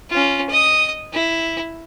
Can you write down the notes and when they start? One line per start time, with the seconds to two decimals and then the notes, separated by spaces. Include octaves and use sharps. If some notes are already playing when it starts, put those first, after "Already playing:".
0.10 C#4 F4
0.49 D#5 D#6
1.13 E4